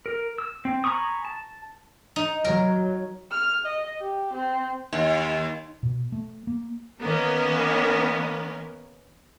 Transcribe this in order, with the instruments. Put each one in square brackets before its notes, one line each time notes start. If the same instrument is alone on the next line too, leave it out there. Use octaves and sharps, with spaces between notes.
[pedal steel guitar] A#4
E6
C4
G#5 A#5 B5 C#6 D#6
A5
[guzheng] D#4
[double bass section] F#3 [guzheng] A#4
[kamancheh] F6
D#5
G4
C4
[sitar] D#2
[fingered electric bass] B2
A3
A#3
[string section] D#3 A#3 B3 C#4 A#4 B4